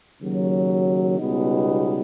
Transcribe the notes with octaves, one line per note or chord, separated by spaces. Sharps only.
D#2 C#3 F#3
C#2 B2 G3 B3 D#4